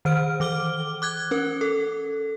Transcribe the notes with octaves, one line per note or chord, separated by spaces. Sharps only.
D#3 C5 F6 D7
E3 D6 F6 G7
D6 F#6 G#6
C#4 A#4
A4